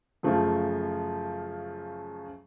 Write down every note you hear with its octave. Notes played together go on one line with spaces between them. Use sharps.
F#2 C#3 F3 A3